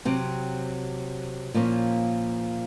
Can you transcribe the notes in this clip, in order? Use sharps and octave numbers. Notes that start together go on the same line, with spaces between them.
C3 F#3 C4
A#2 F3 A#3 C#4